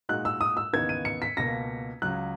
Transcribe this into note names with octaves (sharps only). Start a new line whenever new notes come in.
A#2 G#3 D#4 F#4 F#6
E6
D#6
E6
D#2 C#3 E3 B3 D#4 G#6
D#7
C#7
B6
C#2 B2 A#3 A#6
C#2 C#3 F#3 F#6